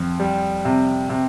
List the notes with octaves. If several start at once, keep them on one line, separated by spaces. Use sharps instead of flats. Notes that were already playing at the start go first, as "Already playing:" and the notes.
Already playing: F2
G3
C3
C3